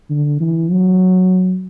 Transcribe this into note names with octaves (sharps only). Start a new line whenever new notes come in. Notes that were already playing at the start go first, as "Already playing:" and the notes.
D3
E3
F#3